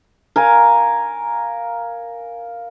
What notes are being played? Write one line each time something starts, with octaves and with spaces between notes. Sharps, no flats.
A#4 F5 G#5